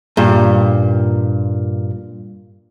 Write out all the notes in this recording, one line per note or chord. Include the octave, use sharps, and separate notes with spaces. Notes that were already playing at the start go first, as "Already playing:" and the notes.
G2 A#2